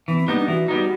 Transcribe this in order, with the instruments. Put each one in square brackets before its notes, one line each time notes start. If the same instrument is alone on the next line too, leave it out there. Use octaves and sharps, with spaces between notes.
[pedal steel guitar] E3 [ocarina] B3
[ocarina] C4
[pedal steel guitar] G3 B3 D#4 [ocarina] A#3
[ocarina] D4
[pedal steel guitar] E3 [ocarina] F#4
[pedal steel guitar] G3 B3 D#4